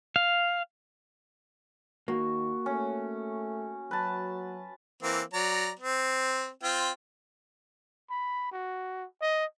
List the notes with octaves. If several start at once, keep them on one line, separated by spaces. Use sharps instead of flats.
F5
D#3 A#3 F#4
A3 C#4
F#3 B4 A5
E3 A#3 C4
F#3 D5 A#5
C4
C4 F4 G5
B5
F#4
D#5